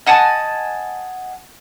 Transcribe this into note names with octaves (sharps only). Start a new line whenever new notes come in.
D#5 F#5 G#5 A5